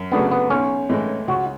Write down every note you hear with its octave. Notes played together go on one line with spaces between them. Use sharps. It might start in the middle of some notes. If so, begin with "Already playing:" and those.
Already playing: F#2
C#3 F#3 A3 B3 D4
B3
B1 C#4
A2 E3 G#3
C#2 F#4